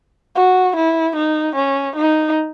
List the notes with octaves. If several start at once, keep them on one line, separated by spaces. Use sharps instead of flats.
F#4
E4
D#4
C#4
D#4